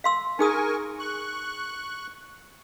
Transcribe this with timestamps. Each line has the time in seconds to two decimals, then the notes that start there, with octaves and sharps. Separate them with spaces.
0.04 F5 C6 E6
0.39 D#4 G#4 A#4 G#5 C#6 D#6
0.99 C#6 F#6